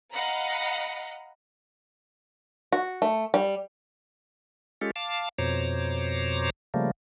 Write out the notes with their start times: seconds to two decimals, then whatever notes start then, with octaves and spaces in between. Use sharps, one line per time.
0.13 D#5 F5 F#5 A#5 B5
2.72 F#4
3.02 A3
3.34 G3
4.81 G#3 C#4 F4 G4 A4
4.96 F5 A5 D6
5.38 F2 B2 C5 C#5 A#5 D6
6.74 C#3 F3 G3 A3 A#3